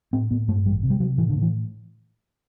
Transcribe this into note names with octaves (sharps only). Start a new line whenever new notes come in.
A2 C4
A2 B3
G2 A3
A1 G3
C3
G3
C3 F#3
A2 E3
D3
A2
E3